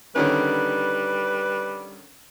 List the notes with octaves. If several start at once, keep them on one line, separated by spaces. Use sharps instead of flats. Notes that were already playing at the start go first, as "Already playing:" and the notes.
D3 D#3 G3 C#4 B4